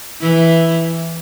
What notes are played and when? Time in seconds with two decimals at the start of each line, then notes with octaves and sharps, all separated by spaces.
0.21 E3 E4